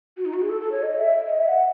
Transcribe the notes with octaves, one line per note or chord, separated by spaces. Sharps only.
F#4
D#4
F#4
G#4
A4
A4
C#5
D#5
E5
D#5
E5
F#5